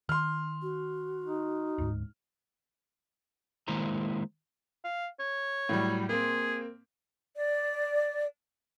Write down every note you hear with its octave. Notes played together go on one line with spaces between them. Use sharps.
D#3 C6 F6
F#4
D#4
D1 G#2
D#3 G#3 A#3 E4 C5 A#5
F5
C#5
A2 F#3 G3
A#3 C4 G#4
D5